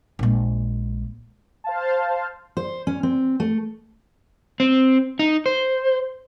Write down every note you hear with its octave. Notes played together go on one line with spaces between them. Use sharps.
A#1 G#3
C5 F5 A5
C5
C#4
C4
A3
C4
D#4
C5